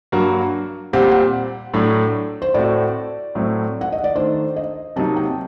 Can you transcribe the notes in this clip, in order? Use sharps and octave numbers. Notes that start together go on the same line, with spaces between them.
G2 F#3 A#3 F#4
A#2 G3 C4 G4 F#5
G5
F#5
A2 F#3 A3 D4
C5
A2 A3 C4 F#4 D5
A2 F#3 A3 C4
F#5
D#5
D5
D#3 A3 D4 C5
D#5
C3 F#3 A#3 D#4 A5
G5